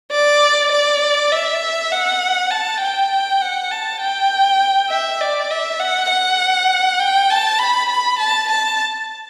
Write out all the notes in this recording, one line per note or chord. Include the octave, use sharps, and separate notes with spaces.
D5
D5
E5
F#5
A5
G5
F#5
A5
G5
E5
D5
E5
F#5
F#5
G5
A5
B5
B5
A5
A5